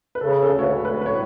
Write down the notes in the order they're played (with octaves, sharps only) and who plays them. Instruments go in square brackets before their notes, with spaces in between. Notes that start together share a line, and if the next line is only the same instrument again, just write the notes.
[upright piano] B4
[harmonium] C#3 [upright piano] A4
[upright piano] A4
[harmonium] D2
[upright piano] C#5
B4
[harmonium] D2
[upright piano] B4
B4
[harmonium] A2 [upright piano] C#5